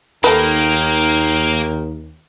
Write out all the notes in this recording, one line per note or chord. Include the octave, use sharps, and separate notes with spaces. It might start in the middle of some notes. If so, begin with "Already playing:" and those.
D#2 D#3 A#3 A4 B4